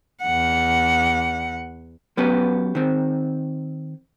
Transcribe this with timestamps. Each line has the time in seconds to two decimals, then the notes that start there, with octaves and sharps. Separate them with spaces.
0.23 E2 F#5
2.17 F#3 B3 C#4 G4 B4
2.75 D#3 C4